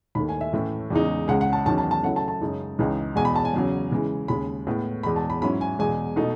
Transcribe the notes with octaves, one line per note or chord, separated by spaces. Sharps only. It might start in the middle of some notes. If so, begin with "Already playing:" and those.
D#2 D#3 A3 B5
G#5
E5
A2 E3 A3 C#4 E4
E2 C#3 G#3 D#4
C#2 C#3 G#3 F#5
F#5
A5
E2 D#3 F#3 C#4 A5
A5
A5
C#3 F#3 A3 E4 F#5
A5
A5
F#2 C#3 G#3 D#4
C#2 C#3 E3 G#3 D#4
E2 B2 G#3 G#5
B5
A5
G#5
E2 C#3 F#3
C#3 E3 G#3
D#2 C#3 G#3 B5
A2 G#3 B3
E2 B2 G#3 B5
A5
B5
G#2 F#3 C#4 E4 B5
G#5
E2 B2 G#3 G#5
B2 A3 D#4